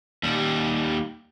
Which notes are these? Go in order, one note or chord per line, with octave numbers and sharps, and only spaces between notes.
D#2 G3